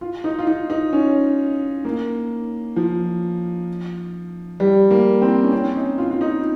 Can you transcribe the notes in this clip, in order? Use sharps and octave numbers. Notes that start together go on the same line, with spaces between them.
F4
D#4
F4
D#4
D#4
C#4
A#3
F3
G3
A#3
C4
C#4
C4
C#4
D#4
F4
F4
D#4